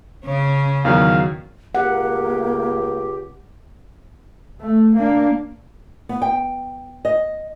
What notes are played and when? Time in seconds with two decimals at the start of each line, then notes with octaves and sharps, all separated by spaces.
0.25 C#3 C#4
0.85 E2 D#3 F#3 F5
1.75 C#2 A#3 G4 F#5
4.61 A3
4.96 A#3 D4
6.09 B3
6.22 G5
7.05 D#5